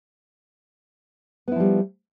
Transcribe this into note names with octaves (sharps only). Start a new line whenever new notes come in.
F3 G3 B3 E4